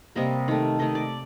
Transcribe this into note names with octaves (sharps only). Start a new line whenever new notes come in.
C3 G3 A#3 D#5
D#3 A3
D#3 A3 D#5
D5